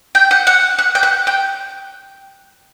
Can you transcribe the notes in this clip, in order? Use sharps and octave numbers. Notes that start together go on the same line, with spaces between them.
G5
F#5
F#5
F#5
G5
F#5
G5